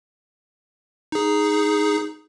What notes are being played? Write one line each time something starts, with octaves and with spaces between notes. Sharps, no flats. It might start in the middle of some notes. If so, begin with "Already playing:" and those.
D#4 G#4